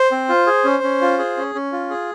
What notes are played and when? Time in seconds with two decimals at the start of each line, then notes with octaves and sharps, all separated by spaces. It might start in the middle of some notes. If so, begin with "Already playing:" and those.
Already playing: C5
0.12 C4
0.29 F4
0.47 G#4
0.64 C#4
0.83 C#4
1.01 F4
1.19 G#4
1.37 C#4
1.55 C#4
1.72 F4
1.90 G#4